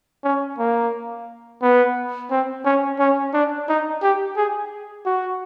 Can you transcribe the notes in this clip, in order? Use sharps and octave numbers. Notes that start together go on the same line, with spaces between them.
C#4
A#3
B3
C4
C#4
C#4
D4
D#4
G4
G#4
F#4